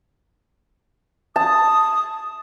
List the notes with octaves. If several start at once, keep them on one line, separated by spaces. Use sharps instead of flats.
A5 D#6